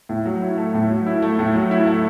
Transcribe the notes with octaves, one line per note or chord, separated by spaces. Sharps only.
A2
F#3
E4
A3
A2
F#3
E4
A3
A2
F#3
E4
A3